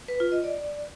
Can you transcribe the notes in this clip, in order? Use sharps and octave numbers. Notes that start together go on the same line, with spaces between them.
B4
F4
D#5
D5